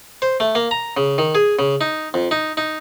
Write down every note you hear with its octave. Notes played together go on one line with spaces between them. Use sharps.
C5
A3
A#3
A#5
C#3
D#3
G#4
C#3
D#4
F2
D#4
D#4